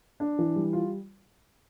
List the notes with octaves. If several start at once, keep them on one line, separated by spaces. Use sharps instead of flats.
D4
E3
G3
F4